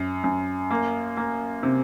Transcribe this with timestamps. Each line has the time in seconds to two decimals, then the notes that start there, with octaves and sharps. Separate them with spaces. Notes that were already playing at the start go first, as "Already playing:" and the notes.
Already playing: F#2
0.24 F#2
0.71 A#3
1.17 A#3
1.63 C3